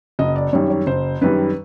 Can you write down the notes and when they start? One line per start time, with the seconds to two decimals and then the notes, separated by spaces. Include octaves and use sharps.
0.19 F#1 D#5
0.36 D5
0.53 F#2 D#3 G3 C#5
0.70 C#5
0.87 F#1 C5
1.21 F#2 D#3 G3 B4